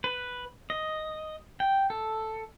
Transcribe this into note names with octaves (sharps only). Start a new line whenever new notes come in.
B4
D#5
G5
A4